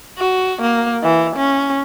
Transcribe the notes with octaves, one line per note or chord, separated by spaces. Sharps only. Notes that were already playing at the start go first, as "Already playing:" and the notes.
F#4
A#3
E3
C#4